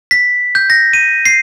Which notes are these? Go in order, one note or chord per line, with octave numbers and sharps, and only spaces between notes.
B6
G6
A#6
D#7
C7